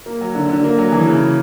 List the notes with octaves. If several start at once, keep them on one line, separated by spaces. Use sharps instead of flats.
A#3
F#3
D3
D3
A#3
F#3
E3
C#3